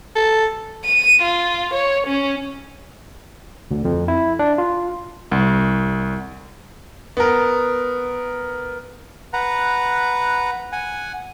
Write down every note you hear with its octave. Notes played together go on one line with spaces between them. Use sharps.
A4
D#7
F4
C#5
C#4
D2
F2
E4
D4
F4
C2
B3 A#4
B4 F#5 A#5
F#5 G#5